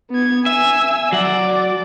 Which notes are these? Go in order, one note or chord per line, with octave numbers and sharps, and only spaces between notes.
B3 G#6
E5 G#5 E6
F#3 D5 F#5